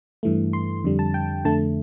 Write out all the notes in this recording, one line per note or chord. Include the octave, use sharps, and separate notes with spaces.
G2 E3 A3
C6
F2 D3 G3
A5
G5
F2 D3 A3 A5